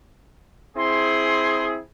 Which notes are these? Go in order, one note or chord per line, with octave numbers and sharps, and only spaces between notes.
C4 E4 G#4 C6